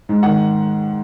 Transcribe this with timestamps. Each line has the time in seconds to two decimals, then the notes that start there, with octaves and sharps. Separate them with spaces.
0.09 G#2
0.23 D#3 F#5